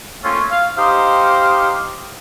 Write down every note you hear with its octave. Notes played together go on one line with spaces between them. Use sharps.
A3 A#3 C4 C#4 F4
F5
D#4 G4 C5 F5